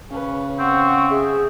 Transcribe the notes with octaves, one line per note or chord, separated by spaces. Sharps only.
C#3 C#4 B4
C4 F#5 C#6
G#4 E5